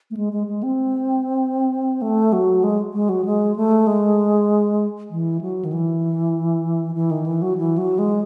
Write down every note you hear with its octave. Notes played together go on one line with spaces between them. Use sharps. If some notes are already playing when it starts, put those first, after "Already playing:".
A3
G#3
G#3
G#3
C4
A3
F#3
G#3
G#3
F#3
G#3
A3
G#3
E3
F#3
D#3
E3
E3
D#3
E3
F#3
E3
F#3
G#3